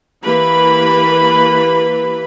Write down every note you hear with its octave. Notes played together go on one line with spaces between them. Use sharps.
E3 A#3 G4 B4 B5